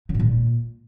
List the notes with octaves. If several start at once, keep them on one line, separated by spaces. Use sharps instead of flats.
C#3
G#2
A#2